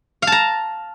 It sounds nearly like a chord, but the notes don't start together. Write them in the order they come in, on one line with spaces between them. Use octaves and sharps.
F5 A5 A#5